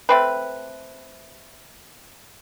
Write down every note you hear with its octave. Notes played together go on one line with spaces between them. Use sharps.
A3 C4 B4